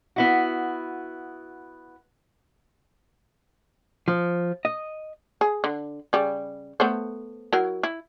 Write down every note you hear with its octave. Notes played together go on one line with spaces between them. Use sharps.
B3 E4 F#4
F3
D#5
G#4
D3
C#3 G3
A3 B3 C5
F#3 E4 A#4
E4